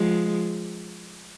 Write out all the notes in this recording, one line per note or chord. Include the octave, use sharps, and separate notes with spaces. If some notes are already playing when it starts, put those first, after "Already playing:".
Already playing: F3 G#3